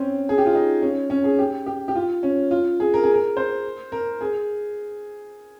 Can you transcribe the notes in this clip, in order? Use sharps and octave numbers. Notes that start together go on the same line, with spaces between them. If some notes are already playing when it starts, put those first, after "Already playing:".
Already playing: C4 C#4
G#4
G4
F4
D#4
C#4
C#4
G#4
G4
G4
G4
F4
C#4
F4
G#4
A#4
G#4
A#4
C5
A#4
G#4